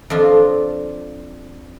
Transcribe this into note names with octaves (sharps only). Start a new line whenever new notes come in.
F2 D4 F4